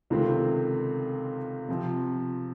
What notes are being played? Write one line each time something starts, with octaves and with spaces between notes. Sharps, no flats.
C#2 C3 D#3 A3 C4
C3 F3 C4